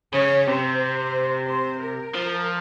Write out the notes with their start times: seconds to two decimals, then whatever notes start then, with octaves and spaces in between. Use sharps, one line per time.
0.13 C#3 C#5
0.47 C3 C5
1.48 C5
1.82 A#4
2.15 F3